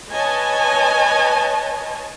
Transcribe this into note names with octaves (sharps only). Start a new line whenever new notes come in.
B4 C#5 D#5 G#5 A5